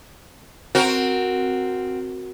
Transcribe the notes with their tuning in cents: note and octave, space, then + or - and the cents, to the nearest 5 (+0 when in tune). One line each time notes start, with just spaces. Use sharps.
C4 +0 F#4 +0 A#4 +0